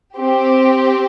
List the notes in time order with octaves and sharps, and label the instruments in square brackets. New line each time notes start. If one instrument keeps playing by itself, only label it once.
[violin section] C4 G4